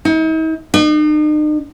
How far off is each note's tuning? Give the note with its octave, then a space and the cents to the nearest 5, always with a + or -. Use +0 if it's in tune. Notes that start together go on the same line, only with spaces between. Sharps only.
D#4 +45
D#4 -45